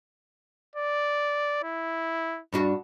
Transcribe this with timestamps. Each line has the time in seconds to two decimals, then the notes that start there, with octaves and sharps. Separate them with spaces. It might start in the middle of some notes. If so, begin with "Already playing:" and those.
0.76 D5
1.63 E4
2.53 G2 D4 F#4